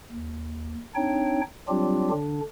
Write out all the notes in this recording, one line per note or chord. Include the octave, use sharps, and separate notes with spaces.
D#2
C4 D4 D#4 C#5 G5
F#3 G3 C4 D4 F4 G4
D3 D4